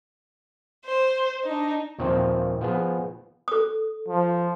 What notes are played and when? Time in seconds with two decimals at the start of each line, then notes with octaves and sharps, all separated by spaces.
0.85 C5
1.44 D4 D#4
1.99 D#2 A#2 D#3 F3 C4 E5
2.61 F3 B3 G#4
3.48 A4 D#6
4.09 F3